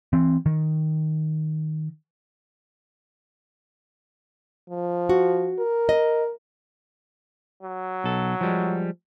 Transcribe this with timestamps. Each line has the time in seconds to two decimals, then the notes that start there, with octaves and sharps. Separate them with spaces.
0.13 E3 C4
0.46 D#3
4.70 F3
5.09 F#4
5.59 A#4
5.89 D#5
7.63 F#3
8.04 B1 A4
8.41 F3 G3 G#3